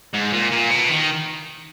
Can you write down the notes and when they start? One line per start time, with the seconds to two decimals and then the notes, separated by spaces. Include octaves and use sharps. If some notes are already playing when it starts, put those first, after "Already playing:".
0.13 G#2
0.33 A#2
0.51 A#2
0.70 B2
0.89 D#3